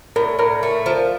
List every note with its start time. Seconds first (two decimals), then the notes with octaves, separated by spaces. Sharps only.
0.16 A2 A#4
0.39 A2 A#4
0.63 A3
0.86 F3